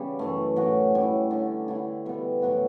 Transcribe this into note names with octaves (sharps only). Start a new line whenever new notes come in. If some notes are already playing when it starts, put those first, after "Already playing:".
Already playing: C#3 G3 B3 C#4
F#2 E3 A3
A2 F#3 C#4 F#4
A2 G3 C#4 E4
D3 G3 C#4
D3 A3 E4
B2 G3 B3
A2 F#3 B3 F#4